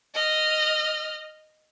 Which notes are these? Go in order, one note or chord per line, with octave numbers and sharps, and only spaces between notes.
D#5 F6